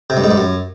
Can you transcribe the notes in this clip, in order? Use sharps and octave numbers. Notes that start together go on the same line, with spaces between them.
C3
G2
G#2
G2
F#2